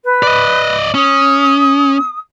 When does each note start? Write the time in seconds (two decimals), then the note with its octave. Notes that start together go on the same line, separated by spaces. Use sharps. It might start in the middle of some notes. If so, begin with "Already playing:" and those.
0.04 B4
0.23 D5 D#5
0.94 C#4 D#6